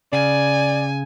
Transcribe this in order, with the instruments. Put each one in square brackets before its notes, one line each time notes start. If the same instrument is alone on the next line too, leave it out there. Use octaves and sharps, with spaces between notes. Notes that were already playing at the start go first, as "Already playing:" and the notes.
[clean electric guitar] C#3 [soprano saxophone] D5 [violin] G#5